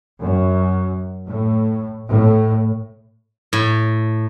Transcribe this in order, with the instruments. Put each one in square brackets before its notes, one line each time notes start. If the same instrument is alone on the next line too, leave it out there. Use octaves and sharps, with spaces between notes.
[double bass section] F#2
A2
A2
[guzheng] A2